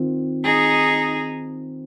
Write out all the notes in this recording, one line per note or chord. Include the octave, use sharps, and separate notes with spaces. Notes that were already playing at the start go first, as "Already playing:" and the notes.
Already playing: D#3 C4 F4
D#4 G#4